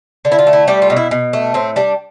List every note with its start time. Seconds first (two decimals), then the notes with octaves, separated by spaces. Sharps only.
0.25 D3
0.32 E4
0.39 F4
0.47 A3
0.53 E4
0.68 G3 G4
0.82 F4
0.90 B2
0.96 E4
1.11 B2
1.33 A3
1.54 A2 C4
1.76 G3 D4